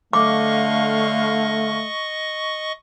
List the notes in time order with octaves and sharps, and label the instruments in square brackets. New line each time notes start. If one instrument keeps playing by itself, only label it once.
[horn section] D3 F5 [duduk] A3 [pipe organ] D#5 C#6 [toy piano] D6